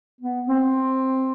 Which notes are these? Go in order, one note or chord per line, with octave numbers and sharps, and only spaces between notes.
B3
C4